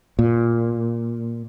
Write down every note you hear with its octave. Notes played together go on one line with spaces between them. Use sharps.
A#2